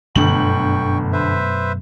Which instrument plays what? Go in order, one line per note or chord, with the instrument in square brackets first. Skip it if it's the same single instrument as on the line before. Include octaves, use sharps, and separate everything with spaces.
[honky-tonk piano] G1 D3 F#7 [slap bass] F#2 B2 A3 [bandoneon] G5 C#6
[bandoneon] B4 C5 E5